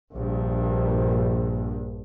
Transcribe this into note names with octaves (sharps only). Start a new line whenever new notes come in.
A#1 G2